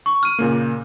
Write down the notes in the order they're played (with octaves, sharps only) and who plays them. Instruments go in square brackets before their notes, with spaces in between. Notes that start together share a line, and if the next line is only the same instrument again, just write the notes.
[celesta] C#6
F6 D#7
[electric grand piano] A#2 C#3 A#3